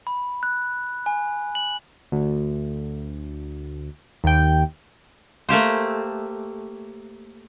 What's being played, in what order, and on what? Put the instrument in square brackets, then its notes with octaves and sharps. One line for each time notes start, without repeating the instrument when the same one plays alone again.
[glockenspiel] B5
F#6
G#5
F#7
[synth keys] D2
D#2 G5
[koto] A3 A#3 G4 C5